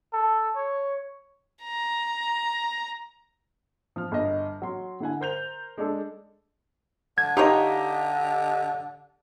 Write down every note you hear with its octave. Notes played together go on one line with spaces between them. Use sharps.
A4
C#5
A#5
F3 F6
G1 D#5
F#3 C6
D3 E4 F#5 G#5
A#4 C5 G6 F7
G#3 D4 A4
D3 G#6
D#4 F4 G4 C#5 D#5